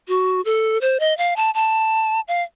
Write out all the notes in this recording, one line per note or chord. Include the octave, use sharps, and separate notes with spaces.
F#4
A4
C5
D#5
F5
A5
A5
F5